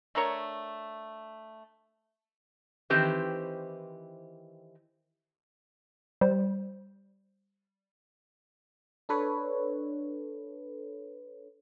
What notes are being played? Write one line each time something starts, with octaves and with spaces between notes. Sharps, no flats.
A3 D4 A#4 C#5
D#3 E3 C4 G4 B4 C5
G3 C5
D4 A4 B4 C#5